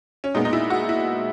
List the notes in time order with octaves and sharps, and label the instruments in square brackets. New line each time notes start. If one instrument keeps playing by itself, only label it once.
[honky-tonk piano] C#4
A#2 G#3 B3 D#4
D#4
E4
F#4
E4